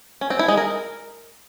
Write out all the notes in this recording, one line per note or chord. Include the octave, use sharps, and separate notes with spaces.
C#4
C4
E4
G#3
A#4